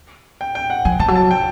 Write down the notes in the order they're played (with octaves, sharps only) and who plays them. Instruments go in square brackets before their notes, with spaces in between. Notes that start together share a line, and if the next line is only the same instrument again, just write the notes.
[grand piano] G5
G5
F#5
[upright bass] F3 [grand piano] G#5
[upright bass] F3 [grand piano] A5
[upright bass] F#3
[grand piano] A5
G5